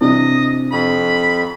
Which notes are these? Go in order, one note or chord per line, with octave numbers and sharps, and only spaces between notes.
C3 E3 G3 D4 D#5
F2 B5